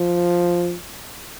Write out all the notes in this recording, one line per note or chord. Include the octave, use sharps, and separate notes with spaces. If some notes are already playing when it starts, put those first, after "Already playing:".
Already playing: F3